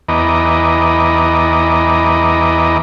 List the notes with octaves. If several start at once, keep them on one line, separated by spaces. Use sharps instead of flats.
E2 B3 D#5 A#5 D6